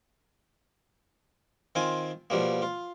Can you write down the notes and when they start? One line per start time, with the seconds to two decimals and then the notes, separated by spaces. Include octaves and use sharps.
1.75 D#3 C4 F4 G#5
2.30 B2 F3 G3 A#3
2.62 F4